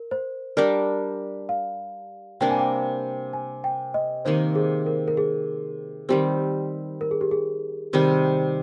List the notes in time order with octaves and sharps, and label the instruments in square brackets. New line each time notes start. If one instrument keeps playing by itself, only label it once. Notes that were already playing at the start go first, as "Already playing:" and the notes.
Already playing: [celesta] A#4
C5
[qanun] G3 D4 G4 A#4 [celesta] D5
[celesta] F5
[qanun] C3 G3 A#3 D4 [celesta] G5
[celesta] G#5
G5
G#5
G5
D#5
[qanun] C3 D#3 A#3 D#4 [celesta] C5
[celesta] G#4
A#4
A#4
G#4
[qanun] D#3 G3 C4 [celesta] G4
[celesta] A#4
G#4
G4
G#4
[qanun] C3 D#3 G3